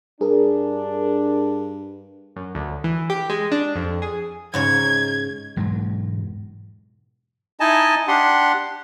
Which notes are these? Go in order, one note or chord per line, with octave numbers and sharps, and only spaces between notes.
G2 D4 G#4 A#4
F#2
D2
E3
G4
G#3
D4
F2
G#4
G#2 C#3 C#5 G#6
E1 G#2 F#3
D#4 E4 D#5 G#5 A5
D4 G4 F#5 C6